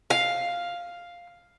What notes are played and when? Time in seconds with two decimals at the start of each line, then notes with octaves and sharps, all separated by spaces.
0.10 F5